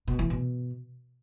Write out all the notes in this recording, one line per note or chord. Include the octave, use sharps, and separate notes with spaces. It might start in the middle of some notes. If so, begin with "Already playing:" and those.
B2
E3
B2